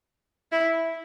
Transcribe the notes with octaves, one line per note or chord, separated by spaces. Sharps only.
E4